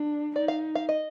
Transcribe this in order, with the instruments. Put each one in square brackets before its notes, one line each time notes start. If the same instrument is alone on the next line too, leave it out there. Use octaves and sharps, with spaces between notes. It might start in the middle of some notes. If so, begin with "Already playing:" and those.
Already playing: [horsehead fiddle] D4
[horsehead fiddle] D#4 [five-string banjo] D5
[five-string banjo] F5
F5
D#5